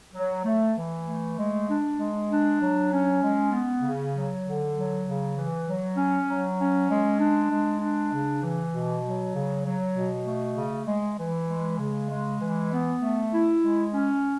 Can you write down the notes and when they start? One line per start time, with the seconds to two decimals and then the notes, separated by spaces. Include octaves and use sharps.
0.15 F#3
0.45 A3
0.77 E3
1.07 A3
1.38 G#3
1.69 D4
1.98 G#3
2.30 D4
2.60 F#3
2.91 C#4
3.21 G#3
3.52 B3
3.82 C#3
4.13 F#3
4.44 D3
4.75 F#3
5.05 C#3
5.36 E3
5.66 F#3
5.97 C#4
6.28 F#3
6.59 C#4
6.89 G#3
7.19 D4
7.50 G#3
7.80 D4
8.12 C#3
8.42 E3
8.73 B2
9.03 F#3
9.34 C#3
9.64 F#3
9.95 B2
10.26 A3
10.56 C#3
10.87 G#3
11.18 E3
11.48 G#3
11.78 C#3
12.10 G#3
12.41 E3
12.71 B3
13.02 A3
13.31 E4
13.63 G#3
13.93 C#4